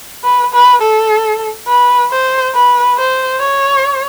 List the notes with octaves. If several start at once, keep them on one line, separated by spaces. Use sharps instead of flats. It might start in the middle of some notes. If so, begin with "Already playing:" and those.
B4
B4
A4
B4
C5
B4
C5
C#5